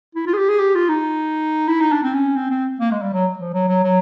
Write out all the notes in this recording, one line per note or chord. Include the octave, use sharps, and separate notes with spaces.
E4
F4
G#4
G4
G#4
G4
F4
D#4
E4
D#4
D4
C4
C#4
C4
C4
A#3
G#3
G3
F#3
F3
F#3
F#3
F#3